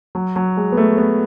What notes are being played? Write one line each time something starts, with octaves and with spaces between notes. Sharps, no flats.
F#3
F#3
G#3
B3
A3
B3